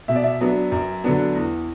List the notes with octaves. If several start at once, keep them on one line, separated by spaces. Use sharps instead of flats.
B2 E5
D5
E5
F#3 B3 D4
F#2
D3 F#3 B3 D4
E2